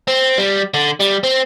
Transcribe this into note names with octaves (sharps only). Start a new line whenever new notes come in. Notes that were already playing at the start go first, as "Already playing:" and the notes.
C4
G3
D3
G3
C4